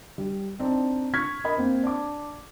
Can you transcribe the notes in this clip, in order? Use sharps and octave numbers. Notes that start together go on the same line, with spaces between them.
G3
C4 D4 D#4
C#6 F6 G#6 B6
A#4 D#5 B5
A#3 C4 C5
D4 D6